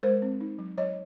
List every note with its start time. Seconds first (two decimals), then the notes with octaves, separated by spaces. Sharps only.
0.03 G#3 A#4 C5
0.22 C4
0.40 D#4
0.59 F#3
0.77 F#3 C#5 D#5